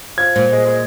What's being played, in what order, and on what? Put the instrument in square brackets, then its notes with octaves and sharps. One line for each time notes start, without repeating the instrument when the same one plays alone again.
[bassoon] F3 [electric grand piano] G#6
[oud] A#2 [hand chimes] C5
[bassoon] G#3
G#3